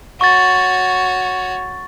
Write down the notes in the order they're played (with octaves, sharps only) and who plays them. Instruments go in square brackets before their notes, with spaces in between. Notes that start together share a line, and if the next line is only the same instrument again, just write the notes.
[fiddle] F#4 C#5 [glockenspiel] C#6 A6